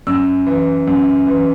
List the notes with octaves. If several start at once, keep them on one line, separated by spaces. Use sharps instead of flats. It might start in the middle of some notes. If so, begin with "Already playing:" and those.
F#2 E6
E3
F#2
E3